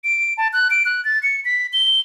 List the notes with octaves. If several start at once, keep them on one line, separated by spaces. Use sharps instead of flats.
D7
A5
F#6
D7
F#6
A6
C#7
B6
G7